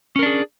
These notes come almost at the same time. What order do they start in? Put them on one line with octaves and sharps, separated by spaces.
C#4 A#4 D4 G#4